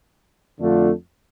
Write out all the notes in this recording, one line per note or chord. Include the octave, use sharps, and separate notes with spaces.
F2 D3 A3 D4 F4